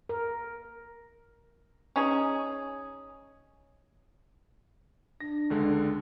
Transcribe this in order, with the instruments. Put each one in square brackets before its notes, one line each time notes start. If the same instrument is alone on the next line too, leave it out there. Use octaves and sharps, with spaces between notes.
[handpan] A#4
[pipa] C#4 D#4 G#4
[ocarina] D4 [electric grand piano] A#6
[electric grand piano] C#2 D3 G#3